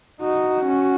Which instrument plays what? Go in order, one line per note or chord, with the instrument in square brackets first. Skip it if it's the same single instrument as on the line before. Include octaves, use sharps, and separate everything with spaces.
[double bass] D#4 [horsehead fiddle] F#4
[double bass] C#4